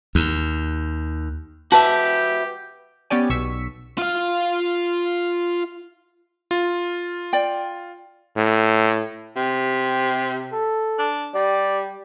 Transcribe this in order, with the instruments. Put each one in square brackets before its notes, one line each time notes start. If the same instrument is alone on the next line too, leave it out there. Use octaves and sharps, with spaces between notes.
[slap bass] D#2
[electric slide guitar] F#4 B4 E5 [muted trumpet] G4 [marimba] A5
[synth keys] B3 C#4 G4 D5 G#5
B1 C#6 E6 B6
[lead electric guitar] F4 F5
[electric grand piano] F4
[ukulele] D5 G5
[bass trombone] A2
[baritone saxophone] C3
[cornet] A4
[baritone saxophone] D4
[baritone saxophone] G3 [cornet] D5